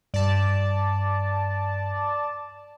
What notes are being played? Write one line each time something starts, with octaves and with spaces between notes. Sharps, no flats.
G2 D5 A5